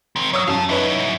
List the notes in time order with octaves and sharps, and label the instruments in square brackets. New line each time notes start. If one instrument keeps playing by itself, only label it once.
[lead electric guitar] D#3 C4
[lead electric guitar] F#3 [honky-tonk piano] C#5 D#6 E6
[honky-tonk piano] F#2 [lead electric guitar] F5 A5
[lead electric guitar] F#2 E4 [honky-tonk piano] D#4 B4 C#5